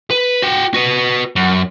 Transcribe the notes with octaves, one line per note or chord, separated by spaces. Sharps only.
B4
F#4 G5
F#4 B4
F#2